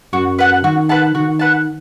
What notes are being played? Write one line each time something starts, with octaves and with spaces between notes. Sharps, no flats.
F#2 F#4
B4 F#5 A5
D#3 F#4
B4 F#5 A5
D#3 F#4
B4 F#5 A5